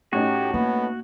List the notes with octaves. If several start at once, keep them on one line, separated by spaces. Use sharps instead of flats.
A2 C#4 D#4 F#4 G4
A#3 B3